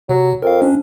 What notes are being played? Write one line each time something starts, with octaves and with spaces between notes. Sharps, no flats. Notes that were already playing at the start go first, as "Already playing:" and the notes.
C3 F#3
F2 A#4 F5
C#4 D4